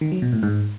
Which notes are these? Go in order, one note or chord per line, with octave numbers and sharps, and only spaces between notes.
D#3
F#3
B2
A2
G#2